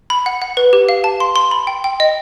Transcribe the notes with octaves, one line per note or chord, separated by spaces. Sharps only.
B5
F#5
F#5
B4
G4
F5
A5
C6
C6
B5
G5
G5
D#5